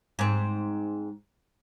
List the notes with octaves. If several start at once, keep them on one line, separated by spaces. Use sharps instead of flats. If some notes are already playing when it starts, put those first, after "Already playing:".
G#2 C4